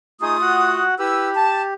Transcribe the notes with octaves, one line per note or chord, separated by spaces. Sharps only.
A3 D#4 F4 G#4 D#6
F#4 F#5
E4 G4 B4 E6
A5